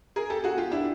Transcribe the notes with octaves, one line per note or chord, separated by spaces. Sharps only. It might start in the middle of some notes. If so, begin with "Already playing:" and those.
G#4 A#4
G4 A4
F#4 G#4
F4 G4
D4 E4